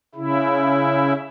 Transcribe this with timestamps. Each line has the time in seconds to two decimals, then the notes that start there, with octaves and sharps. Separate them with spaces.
0.15 C#3 E4